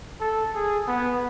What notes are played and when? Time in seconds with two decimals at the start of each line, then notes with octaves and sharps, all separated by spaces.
0.21 A4
0.55 G#4
0.88 B3